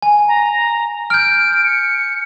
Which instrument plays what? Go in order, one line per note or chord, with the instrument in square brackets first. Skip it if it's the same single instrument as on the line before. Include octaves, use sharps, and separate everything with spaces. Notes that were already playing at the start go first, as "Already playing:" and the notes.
[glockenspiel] G#5
[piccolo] A#5
[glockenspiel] F6 G6 [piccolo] D7
[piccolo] C#7